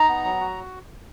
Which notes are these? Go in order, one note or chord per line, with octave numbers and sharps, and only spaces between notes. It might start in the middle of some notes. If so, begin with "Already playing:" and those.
Already playing: D#4 A#5
B3
F#3
F#4